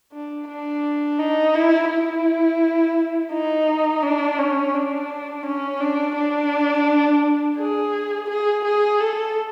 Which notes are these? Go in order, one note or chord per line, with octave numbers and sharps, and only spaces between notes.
D4
D4
D#4
E4
E4
D#4
D4
C#4
D4
C#4
D4
D4
G#4
G#4
G#4
A4